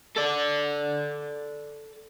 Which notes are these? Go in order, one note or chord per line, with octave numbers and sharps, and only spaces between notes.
A4 D5